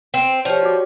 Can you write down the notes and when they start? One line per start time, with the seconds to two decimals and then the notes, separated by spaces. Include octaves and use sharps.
0.14 C4
0.45 F3 G4 C#5 D5
0.63 F#4 D6